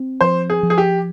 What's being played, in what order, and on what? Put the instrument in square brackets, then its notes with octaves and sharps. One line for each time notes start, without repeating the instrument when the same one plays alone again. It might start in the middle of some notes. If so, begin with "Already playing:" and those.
Already playing: [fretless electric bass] C4
[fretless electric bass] F3 [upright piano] C5
[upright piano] G#4
[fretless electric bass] F3
[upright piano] G#4
G4